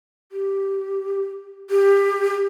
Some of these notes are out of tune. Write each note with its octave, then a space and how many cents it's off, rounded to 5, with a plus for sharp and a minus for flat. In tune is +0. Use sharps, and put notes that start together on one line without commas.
G4 -5
G4 +20